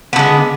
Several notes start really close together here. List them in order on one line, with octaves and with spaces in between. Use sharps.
B3 D3 G#3